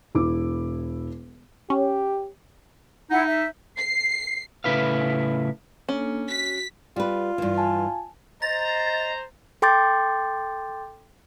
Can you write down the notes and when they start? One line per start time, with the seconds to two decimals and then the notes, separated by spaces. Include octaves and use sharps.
0.15 E1 E4 D6
1.70 C#4 G4
3.10 D#4 E4 F#5
3.27 E5
3.77 C7
4.64 A2 C#3 E4 B4 F5
5.89 A#3 C#4 D4 A4
6.29 F#4 B6
6.96 G3 F4 B4
7.38 G2 E3
7.58 G#5 A5
8.42 C5 D#5 A#5 A6
9.62 A4 G5 C6 D6 G6 A6